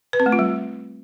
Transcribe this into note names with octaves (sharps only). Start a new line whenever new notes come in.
B4
C4
A3
F4
G3